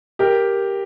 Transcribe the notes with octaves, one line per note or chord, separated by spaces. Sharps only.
G4 A#4